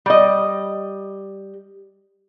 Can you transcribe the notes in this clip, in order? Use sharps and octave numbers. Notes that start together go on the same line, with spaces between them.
G3 D#5